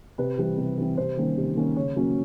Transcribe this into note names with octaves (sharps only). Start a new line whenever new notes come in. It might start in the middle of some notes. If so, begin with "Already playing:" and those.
C3 B4
E3 G3 C4
C3
E3 G3 C4
C3 C5
D#3 G3 A#3 C#4
C3
D#3 G3 A#3 C#4
C#3 C#5
F#3 A#3 C#4